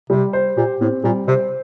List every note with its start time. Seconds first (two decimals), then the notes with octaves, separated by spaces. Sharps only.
0.10 C3 G3
0.33 C5
0.57 A#2 G4
0.81 A2 C4
1.04 A#2 G3
1.28 C3 C5